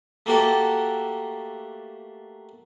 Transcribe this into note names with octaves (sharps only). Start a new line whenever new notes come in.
A3 A#3 F#4 G4 A4